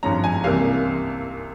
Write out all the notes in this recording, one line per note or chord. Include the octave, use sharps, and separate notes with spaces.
G#1 G2 F3 G#3 C#4 A#5
G#5
C2 C3 E3 G3 A#3 F5